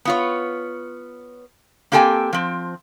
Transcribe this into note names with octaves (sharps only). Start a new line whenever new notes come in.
B3 F4 C#5
A#3 C4 G4 A4 G5 G#5
F3 C4